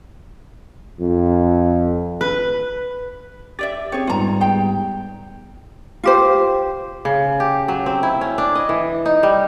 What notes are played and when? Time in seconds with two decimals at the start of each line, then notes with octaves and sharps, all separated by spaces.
1.01 F2
2.21 B4
3.59 G4 D5 E5 A6
3.92 C4 G#4 C#5 G5
4.07 G#2 G3 B3 F4 A#5
4.41 G4 G#4 G5
6.04 F4 G4 C5
7.05 C#3
7.40 G4
7.68 F#3
7.86 C4
8.03 E4
8.21 C#4
8.38 D4
8.55 D#5
8.69 E3
9.06 D#4
9.23 G3